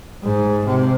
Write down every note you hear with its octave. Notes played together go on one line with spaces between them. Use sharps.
G#2
C3